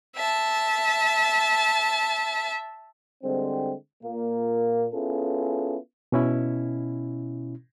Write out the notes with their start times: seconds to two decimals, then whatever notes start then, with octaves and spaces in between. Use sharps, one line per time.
0.16 E5 A5
3.23 D3 G3 G#3 C4
4.04 A#2 A#3
4.93 B3 C#4 E4 F4 G#4 A4
6.12 B2 C#4 E4